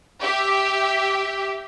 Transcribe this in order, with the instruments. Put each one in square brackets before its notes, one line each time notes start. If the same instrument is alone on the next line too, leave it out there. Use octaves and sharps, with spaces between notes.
[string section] G4 E5